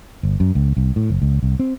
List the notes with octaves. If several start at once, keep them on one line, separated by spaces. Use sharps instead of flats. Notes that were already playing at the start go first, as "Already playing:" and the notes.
G1
F#2
C#2
C2
A2
F#1
C#2
C2
C4